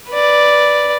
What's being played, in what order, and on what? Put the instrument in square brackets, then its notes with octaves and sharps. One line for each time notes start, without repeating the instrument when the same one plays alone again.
[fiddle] B4 D5